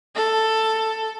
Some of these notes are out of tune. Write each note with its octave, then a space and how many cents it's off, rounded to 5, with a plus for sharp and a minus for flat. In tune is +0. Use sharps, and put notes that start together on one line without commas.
A4 +10